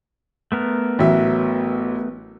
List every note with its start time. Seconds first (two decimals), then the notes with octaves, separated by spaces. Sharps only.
0.52 A3 B3 A#4
0.99 A1 F#3 E5